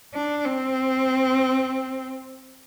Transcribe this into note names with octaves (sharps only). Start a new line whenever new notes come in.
D4
C4